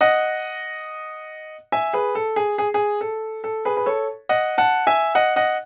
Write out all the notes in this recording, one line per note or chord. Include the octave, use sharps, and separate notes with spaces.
D#5 F#5
E5 G#5
G#4 B4
A4
G#4
G#4
G#4
A4
A4
G#4 B4
B4
A4 C#5
D#5 F#5
F#5 A5
E5 G#5
D#5 F#5
D#5 F#5